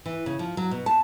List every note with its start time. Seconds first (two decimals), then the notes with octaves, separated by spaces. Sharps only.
0.06 E3
0.26 C#3
0.39 F3
0.57 F#3
0.71 B2
0.86 A5